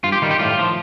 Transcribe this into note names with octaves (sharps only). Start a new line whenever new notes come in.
G2 F4
G4
D#3 G3 F4
G4
A2 F4
F3